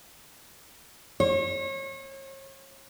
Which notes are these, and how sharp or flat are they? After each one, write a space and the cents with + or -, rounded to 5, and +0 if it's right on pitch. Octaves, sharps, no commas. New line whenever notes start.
C#5 -35